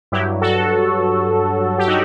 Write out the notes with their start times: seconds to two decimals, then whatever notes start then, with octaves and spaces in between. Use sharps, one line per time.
0.12 G2 F#3 E4 G4
0.41 F#4 A4
1.78 G4
1.88 D#4 F#4